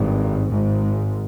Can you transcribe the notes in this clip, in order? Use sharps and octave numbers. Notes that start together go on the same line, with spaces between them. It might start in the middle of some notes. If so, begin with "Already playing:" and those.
Already playing: G#1 G2
G#1 G#2